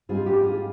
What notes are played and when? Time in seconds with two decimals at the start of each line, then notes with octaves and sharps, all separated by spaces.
0.09 G#2 G3 C4 D#4 F4 G#4
0.26 G4
0.43 F4 G#4